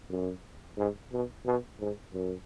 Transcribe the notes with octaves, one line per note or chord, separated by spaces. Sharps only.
F#2
G#2
B2
B2
G#2
F#2